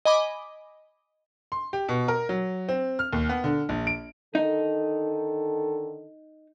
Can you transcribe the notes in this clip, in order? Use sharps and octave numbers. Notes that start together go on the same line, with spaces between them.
D#5 G#5 B5 D6
C6
G4
B2
A#4
F#3
C4
F6
D#2
B3
D3
A#1
D7
D3 D#3 D#4 A4